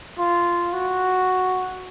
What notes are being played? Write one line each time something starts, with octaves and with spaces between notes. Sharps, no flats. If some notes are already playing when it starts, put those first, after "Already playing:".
F4
F#4